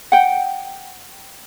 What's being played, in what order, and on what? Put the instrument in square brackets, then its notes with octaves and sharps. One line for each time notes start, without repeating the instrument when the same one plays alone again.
[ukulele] F#5 G5